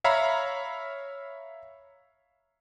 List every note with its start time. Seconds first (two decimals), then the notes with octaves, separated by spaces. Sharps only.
0.04 C#5 E5 F5 A#5 B5